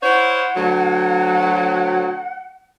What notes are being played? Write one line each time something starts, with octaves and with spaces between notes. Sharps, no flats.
E4 C5 C#5 F#5
D2 F#3